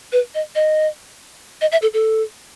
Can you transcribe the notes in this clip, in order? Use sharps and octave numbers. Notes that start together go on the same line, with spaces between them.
B4
D#5
D#5
D#5
E5
A4
A4